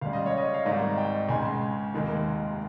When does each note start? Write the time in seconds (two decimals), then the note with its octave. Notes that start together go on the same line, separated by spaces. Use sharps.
0.01 C#2 C#3 G3 F5
0.13 D#5
0.26 C#5
0.38 D#5
0.54 F5
0.65 G#1 G#2 D#3 G3 D#5
0.97 G5
1.29 C#2 C#3 G#3 G#5
1.93 F1 D#2 D#3 G#3